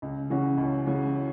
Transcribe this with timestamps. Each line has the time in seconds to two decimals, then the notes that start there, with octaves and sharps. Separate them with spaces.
0.02 C#2
0.30 C#3 E3 C#4 F#4
0.58 C#2
0.86 C#3 E3 C#4 F#4